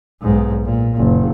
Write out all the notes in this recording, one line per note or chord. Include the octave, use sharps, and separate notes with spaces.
B1 G#2
A#2
F#1